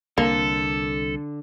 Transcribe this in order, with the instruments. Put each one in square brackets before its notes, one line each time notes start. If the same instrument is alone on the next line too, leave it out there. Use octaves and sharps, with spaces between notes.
[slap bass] C2 [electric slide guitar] D3 [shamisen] A#3 [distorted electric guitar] A4